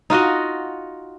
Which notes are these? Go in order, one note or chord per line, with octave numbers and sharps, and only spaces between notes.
D#4 F4 F#4 D#5